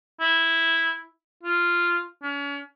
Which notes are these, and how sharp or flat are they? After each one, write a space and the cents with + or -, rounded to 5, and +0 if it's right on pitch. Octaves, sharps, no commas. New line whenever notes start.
E4 -5
F4 -5
C#4 +35